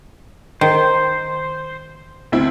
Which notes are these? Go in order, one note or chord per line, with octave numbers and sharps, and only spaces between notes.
D#3 C5
D2 C4 E4